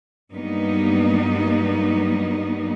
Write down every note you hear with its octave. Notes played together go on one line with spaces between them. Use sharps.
G2 F#3 G3 A#3 B3 D#4